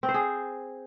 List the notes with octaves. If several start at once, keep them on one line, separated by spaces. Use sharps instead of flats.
C4
C5
G#4